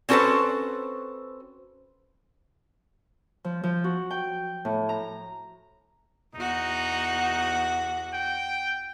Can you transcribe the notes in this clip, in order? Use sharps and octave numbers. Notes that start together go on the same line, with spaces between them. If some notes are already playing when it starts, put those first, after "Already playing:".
C4 C#4 F#4 A4 B4 C5
F3
F3
F#4
G5
A2
A#5
E2 D#4 F#4
G5